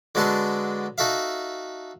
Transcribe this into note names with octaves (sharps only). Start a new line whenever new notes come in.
D3 F#3 G#3 B3 D4 A4
D#4 F#4 A4 E5 F5